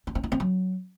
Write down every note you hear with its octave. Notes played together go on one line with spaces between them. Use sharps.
D4
C4
D#4
C4
F#3